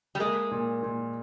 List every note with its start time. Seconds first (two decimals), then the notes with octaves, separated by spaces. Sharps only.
0.15 G3
0.20 G#3 A#3
0.51 A#2
0.83 A#2